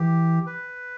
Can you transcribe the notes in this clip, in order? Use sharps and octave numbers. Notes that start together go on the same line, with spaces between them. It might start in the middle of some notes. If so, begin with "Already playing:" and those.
Already playing: E3 G4
B4